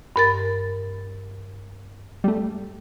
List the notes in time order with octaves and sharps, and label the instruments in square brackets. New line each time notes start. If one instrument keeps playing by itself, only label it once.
[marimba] G2 A#4 A6
[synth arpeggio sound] G3 A3